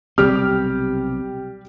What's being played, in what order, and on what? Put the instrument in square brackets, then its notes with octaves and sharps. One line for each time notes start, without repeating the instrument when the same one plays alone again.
[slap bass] B1 C3 C4 [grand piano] G3 G4 F6